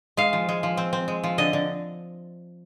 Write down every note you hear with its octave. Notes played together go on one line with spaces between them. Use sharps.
G#3 F5
F3
G#3
F3
C4
C4
G#3
F3
D3 D#5
D3